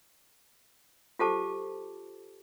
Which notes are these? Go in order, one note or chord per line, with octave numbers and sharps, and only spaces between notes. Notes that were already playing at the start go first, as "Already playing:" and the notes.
F4 G4 A4 C5 A5 D6